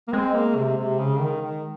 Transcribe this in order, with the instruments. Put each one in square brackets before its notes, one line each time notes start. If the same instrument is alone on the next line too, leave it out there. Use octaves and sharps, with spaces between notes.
[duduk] A#3
[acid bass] G#3 [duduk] C4
[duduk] A#3
C3
C3
C#3
D#3
D#3